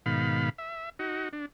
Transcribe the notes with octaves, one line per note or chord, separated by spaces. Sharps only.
G#2 B2 D#3 F5 B5
E5
D#4 F#4
D4